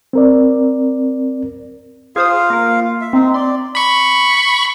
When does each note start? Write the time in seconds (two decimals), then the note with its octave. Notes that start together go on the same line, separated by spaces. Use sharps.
0.13 C4 A#4 D5
2.16 F4 G#4 C5 F5 D#6
2.50 A#3 A#4
3.01 E5
3.13 C4 D#4
3.34 D5 C6
3.75 B5 C#6